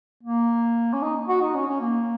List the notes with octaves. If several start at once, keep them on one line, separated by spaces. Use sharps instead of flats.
A#3
C#4
D#4
F#4
D#4
C#4
C#4
A#3